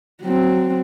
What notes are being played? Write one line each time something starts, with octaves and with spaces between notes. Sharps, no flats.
F#3 C4